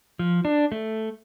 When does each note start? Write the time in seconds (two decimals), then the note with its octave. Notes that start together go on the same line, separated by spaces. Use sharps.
0.19 F3
0.45 D4
0.72 A3